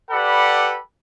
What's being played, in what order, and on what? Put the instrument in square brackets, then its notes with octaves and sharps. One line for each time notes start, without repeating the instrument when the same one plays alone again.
[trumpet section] G4 A4 B4 D5 F#5 B5